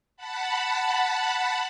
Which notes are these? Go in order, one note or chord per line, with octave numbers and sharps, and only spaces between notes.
F#5 A5 B5